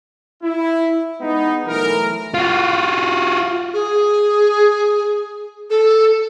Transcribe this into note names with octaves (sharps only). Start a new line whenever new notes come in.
E4
G#3 B3 D#4
B1 E3 A3 A#4
F4 F#4
G#4
A4